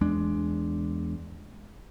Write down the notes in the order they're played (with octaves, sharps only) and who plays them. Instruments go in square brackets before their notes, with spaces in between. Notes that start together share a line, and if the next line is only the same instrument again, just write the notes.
[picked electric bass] E2 G#3 D4